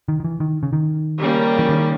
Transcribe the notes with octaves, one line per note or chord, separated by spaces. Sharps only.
D#3
D#3
E3
D#3
C#3
D#3
C#3 G3 A#3
E3
D#3